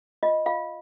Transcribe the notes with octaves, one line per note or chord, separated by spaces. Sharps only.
F4 D#5
F4 F5